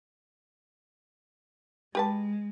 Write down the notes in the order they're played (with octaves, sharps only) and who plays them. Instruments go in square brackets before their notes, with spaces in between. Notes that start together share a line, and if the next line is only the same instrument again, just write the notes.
[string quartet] G#3 [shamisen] G4 B4 A5